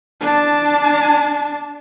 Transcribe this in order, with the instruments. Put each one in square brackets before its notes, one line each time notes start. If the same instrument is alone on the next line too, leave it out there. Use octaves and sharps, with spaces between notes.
[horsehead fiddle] D4 A5